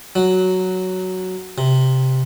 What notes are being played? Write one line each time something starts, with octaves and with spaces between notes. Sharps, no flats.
F#3
C3